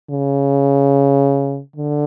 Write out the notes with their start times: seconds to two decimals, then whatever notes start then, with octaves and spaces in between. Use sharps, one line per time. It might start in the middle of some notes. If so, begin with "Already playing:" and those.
0.10 C#3
1.76 D3